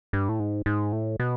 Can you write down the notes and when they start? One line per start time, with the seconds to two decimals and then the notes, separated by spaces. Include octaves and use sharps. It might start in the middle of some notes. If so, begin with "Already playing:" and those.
0.13 G2
0.29 A2
0.40 G#2
0.66 G#2
0.93 A2
1.20 B2